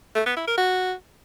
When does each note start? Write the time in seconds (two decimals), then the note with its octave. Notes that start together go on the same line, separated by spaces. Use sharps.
0.15 A3
0.26 B3
0.36 E4
0.47 A#4
0.58 F#4